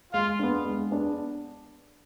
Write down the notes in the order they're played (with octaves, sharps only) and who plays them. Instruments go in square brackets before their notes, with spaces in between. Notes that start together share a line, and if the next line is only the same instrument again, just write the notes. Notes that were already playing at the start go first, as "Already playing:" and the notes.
[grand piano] G#3 [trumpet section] F4
[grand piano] B3 D4
G#3
B3 D4